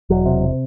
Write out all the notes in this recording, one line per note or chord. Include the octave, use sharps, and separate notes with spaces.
E1 F#3
C3